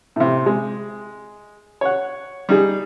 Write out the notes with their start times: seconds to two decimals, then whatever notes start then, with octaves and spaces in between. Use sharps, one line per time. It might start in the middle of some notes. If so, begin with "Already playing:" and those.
0.16 A2 C3
0.46 G#3
1.81 C#5 F#5
2.49 G3 D#4 G#4